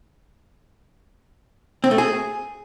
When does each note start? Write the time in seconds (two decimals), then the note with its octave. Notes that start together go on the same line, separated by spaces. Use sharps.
1.84 C4
1.91 A3
1.98 G#4